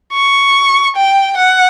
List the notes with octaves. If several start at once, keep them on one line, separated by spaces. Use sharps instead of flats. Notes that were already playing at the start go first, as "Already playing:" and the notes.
C#6
G5
F#5